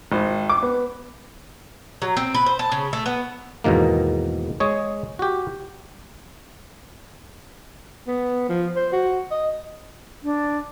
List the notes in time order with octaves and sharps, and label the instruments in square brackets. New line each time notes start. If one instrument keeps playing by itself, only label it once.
[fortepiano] G#1
D6
B3
[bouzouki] F#3
C4
B4
C5
A5
C#3
A3
B3
[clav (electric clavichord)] E2 G#2 B2 D#3 A#3
G#3 G#4 C#5
F#4 G4
[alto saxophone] B3
F3
C5
F#4
D#5
[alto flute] D4